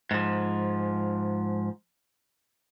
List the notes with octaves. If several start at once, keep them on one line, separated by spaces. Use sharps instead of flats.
G#2 F3